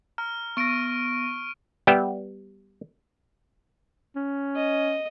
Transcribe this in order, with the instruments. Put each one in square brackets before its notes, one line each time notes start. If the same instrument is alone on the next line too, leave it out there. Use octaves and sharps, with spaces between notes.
[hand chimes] A#5 [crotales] F6
[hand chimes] B3 A#6 [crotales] C#6 D7 D#7
[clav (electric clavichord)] G3 B3 E5 G5
[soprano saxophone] C#4
[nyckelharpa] D#5